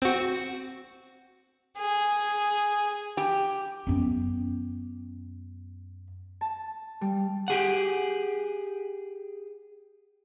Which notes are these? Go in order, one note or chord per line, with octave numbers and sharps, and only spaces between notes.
C4 F#4
G#4
G4
F#2 B3
A5
G3
G4 G#4 F#5